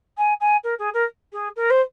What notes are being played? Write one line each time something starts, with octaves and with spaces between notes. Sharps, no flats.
G#5
G#5
A#4
G#4
A#4
G#4
A#4
C5